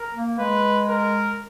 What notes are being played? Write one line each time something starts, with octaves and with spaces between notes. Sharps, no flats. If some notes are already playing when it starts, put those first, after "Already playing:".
Already playing: A#4
A#3
G#3 B4
A#4